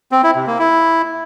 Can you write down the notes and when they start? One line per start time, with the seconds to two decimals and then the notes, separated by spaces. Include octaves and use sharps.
0.12 C4
0.24 E4
0.35 C3
0.47 A#3
0.59 E4